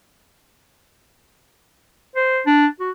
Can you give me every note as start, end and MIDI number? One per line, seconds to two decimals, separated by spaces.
2.16 2.41 72
2.46 2.67 62
2.80 2.91 66